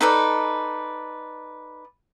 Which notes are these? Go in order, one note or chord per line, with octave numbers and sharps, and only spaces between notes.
D#4 A4 B4 D5